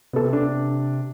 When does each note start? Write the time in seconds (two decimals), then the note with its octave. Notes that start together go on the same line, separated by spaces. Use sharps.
0.13 C3 B3 A4
0.33 D4